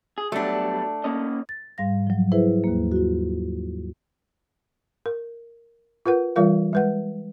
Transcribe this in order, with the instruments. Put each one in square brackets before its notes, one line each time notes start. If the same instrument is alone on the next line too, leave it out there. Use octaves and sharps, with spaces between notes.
[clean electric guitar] G#4
[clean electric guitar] F#3 G3 B3 [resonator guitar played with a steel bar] A3 D4
[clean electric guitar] A#3 C#4 D#5
[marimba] A6
G#2 G3 F5 A#6
F3 F#3
E4 G#4 B4 C5 E5
D#2 A#3
F4 F#4
[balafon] A#4
F4 A#4 B4 F#5
E3 G3 F4 A#4 F5
G#3 B4 F#5